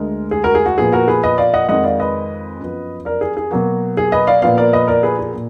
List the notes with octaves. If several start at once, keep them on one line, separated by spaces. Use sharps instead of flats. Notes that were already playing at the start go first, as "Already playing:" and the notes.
Already playing: D2 D3 G#3 A#4
G#4
F#4 A#4
G#4
F#4
A#2 F3 B3 G#4
F#4 A#4
G#4 B4
B4 D#5
D5 F5
D#5 F#5
F2 D#3 G#3 D#5 F#5
D5 F5
B4 D#5
F#2 F3 B3
A#4 D5
G#4
G#4
B2 F#3 A#3 F#4
G#4
B4 D#5
D5 F5
A#2 F3 B3 D5 F5
A#4 D5
B4 D#5
A#4 D5
G#4 B4
G#4
A#2